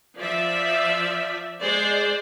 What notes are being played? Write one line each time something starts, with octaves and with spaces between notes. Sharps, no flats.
F3 D5 E5
G#3 C5 D5